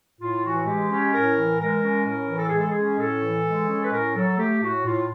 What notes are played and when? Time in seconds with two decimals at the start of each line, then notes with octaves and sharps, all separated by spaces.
0.20 A2 F4
0.43 E3 F#4
0.66 G#3 G4
0.89 C#4 G4
1.13 A2 A#4
1.36 E3
1.59 G#3 A#4
1.83 C#4
2.06 A2 A#4
2.29 E3
2.37 A4
2.47 G#4
2.53 G#3 A4
2.67 G#4
2.76 C#4
2.99 A2 A4
3.22 E3
3.46 G#3
3.69 C#4
3.81 B4
3.92 A2 A#4
4.15 F#3 A4
4.38 A3 G4
4.62 A2 F#4
4.85 A2 F4